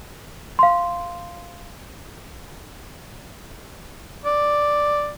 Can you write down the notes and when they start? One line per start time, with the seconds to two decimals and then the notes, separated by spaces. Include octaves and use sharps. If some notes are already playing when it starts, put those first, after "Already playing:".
0.59 F5 C6
4.25 D5